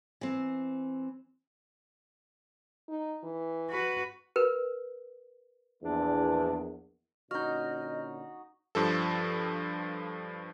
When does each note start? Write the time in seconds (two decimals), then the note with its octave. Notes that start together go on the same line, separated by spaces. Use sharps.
0.21 E3 C4
2.89 D#4
3.23 E3
3.70 F#4 B4
4.36 A#4 B4
5.83 A#1 E2 D4
7.31 A#2 D3 C#4 D#4 F#4 D#5 F6 G6
8.75 G2 F3 A4